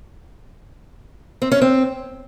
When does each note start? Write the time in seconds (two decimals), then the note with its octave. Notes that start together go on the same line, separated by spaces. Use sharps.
1.42 C4
1.52 C#4
1.61 C4